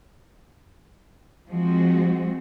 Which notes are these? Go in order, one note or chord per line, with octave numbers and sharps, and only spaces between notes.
F3 G#3 C4 F#4